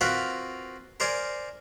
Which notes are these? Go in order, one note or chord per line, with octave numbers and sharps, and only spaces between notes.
C4 F4 F#4 A#4 B4
A#4 C5 D5 G#5